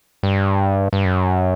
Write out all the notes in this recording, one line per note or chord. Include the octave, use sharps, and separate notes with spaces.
G2
G2
F#2